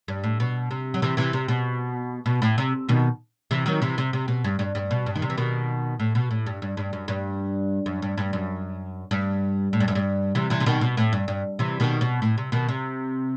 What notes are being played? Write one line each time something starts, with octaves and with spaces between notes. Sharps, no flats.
G2
A2
B2
C3
F#3
C3 E3
C3 E3
C3
B2
B2
A2
C3
B2 D#3
C3 E3
D#3 F#3
C3 E3
C3
C3
B2
G2
G2
G2
B2
G2
D#3
C3
E3
B2 D#3
A2
B2
A2
G2
G2
G2
F#2
G2
F#2
G2
G2
F#2
G2
A2
G2
F#2
G2
C3 E3
C3 E3
C3
B2 D#3
B2
A2
G2
G2
C3 E3
B2 D#3
B2
A2
C3
B2 D#3
C3